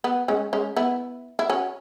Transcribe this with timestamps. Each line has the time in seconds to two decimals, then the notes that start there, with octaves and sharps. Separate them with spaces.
0.04 B3
0.28 G#3 C#4
0.53 G#3 C#4
0.77 B3 E4
1.39 E4
1.50 C#4 F#4